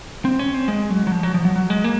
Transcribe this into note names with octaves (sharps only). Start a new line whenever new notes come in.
C4
C#4
C4
G#3
F#3
F#3
F3
F#3
F3
F#3
F#3
G#3
A#3